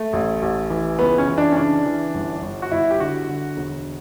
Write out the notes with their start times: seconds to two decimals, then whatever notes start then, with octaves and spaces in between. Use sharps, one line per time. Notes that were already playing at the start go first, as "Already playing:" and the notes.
Already playing: A3
0.13 A1
0.42 A1
0.70 E3
0.99 C#2 B3
1.18 C#4
1.28 E3
1.38 D4
1.52 C#4
1.56 C#3 D4
1.85 E3
2.15 G1
2.42 G1
2.62 F#4
2.71 G1 E4
2.91 G4
3.00 D3 F#4
3.29 D3
3.57 E1